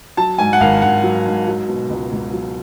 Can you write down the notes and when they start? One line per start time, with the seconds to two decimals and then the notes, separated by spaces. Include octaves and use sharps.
0.17 F#3 A5
0.38 G#2 G#5
0.53 F#5
0.61 G#1 F5
0.82 G#1 F#5
1.04 F#3
1.26 G#2
1.48 F#3
1.69 B2
1.90 C#2
2.12 C#2
2.33 F#3